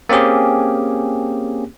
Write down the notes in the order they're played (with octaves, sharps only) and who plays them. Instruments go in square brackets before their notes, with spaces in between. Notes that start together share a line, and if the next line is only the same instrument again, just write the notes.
[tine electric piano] A#3 C4 C#4 G4 G#4